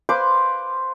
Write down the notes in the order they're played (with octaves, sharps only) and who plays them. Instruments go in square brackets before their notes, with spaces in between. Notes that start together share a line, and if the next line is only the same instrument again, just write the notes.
[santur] B4 C5 F5 D6